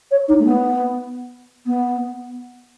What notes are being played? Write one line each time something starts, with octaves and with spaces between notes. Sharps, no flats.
C#5
D#4
A3
B3
B3